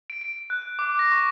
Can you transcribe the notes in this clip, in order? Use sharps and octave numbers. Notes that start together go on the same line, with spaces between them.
D7
D7
F#6
F#6
D6
A#6
C#6